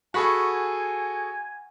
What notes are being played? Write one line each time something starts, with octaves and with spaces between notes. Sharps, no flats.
F#4 G#4 A4 F#5 G#5 B5 C#6